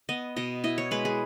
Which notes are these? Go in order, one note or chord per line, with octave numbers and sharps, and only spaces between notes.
B3 D#5
B2 D#5
E4 D#5
C#5
G#3 B4
G#4